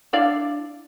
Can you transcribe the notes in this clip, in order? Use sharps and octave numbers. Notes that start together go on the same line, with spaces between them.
D4 E4 D5 F5